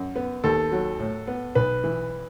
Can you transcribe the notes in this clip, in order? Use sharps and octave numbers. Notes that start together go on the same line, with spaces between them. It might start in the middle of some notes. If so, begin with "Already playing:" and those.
Already playing: F#2
B3
D#2 A4
F#3
A2
B3
B1 B4
E3